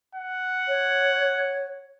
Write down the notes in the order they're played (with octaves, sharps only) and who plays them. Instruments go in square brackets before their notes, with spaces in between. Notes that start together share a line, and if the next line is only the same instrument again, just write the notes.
[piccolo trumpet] F#5
[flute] C#5